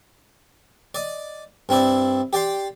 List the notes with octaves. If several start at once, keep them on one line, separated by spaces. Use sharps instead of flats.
D5 D#5
G2 C4 E4 D5
G4 D5 G5 C6